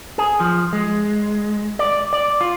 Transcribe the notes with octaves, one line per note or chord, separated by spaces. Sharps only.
G#4
F3
G#3
D5
D5
F4